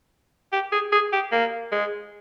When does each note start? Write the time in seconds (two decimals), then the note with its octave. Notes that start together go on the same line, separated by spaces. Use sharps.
0.53 G4
0.72 G#4
0.92 G#4
1.13 G4
1.32 A#3
1.72 G#3